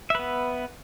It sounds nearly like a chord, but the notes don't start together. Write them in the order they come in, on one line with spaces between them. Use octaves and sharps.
E5 B4 B3